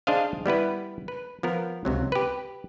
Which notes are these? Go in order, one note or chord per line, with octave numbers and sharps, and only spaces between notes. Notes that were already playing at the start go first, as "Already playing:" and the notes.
D4 G#4 C5 D#5 F5
G3 B3 E4 B4
B4
F3 B3 A#4
C#2 C3 F#3
G4 B4